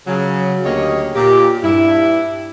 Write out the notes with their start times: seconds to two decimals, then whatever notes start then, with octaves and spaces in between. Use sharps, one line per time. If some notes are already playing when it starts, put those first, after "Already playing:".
0.07 C#3 F#3
0.64 D2 A#3 G4 G#4 C#5 D#5
1.15 A#2 G4
1.63 G2 E4